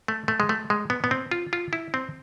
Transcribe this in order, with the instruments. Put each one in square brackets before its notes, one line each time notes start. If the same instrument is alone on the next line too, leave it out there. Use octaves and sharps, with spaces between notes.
[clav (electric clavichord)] A3
A3
G#3
A3
G#3
B3
B3
C4
F4
F4
E4
C4